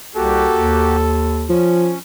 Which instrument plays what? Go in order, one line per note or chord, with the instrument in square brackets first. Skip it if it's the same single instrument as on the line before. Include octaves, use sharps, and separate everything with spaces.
[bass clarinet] C2 [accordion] A#3 F#4 G4 [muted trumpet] A4
[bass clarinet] D#2
[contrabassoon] F3 [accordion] C#4